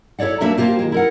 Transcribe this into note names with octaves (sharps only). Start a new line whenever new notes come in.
E4 A4 C#5 D5 F#5
G3 A3 A#3 D4 B4 E5
A#3 F4 G4 C5
D#3 G#3
E4 A#4 F#5